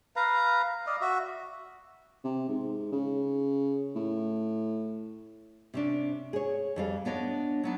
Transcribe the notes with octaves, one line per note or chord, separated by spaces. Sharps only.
B4 F5 A#5
D5 D#5 F5
F#4 E5
C3
G#2
C#3
A2
C3 C#4 D4
G#4 C#5
F2 G3 F5
B3 D4 C#5 D#5
F#3 B3 D4